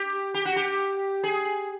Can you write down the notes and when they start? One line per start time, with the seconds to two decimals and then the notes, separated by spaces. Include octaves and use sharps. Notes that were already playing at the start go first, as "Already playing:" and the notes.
Already playing: G4
0.34 G4
0.45 F#4
0.56 G4
1.23 G#4